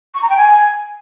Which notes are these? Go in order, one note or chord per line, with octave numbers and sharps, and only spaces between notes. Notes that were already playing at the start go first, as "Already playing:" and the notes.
C#6
A#5
G5
G#5